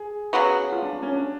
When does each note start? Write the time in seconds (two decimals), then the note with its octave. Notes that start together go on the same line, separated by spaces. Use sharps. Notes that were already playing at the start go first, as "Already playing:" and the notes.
Already playing: G#4
0.33 C#3 F#3 B3 F#4
0.72 F4
0.82 D4
0.93 D4
1.03 C#4
1.12 D4